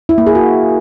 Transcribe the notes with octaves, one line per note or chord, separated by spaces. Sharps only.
E4
A#3
G#4
F#4